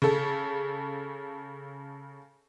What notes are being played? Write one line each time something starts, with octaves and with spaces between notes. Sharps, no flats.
C#3 A4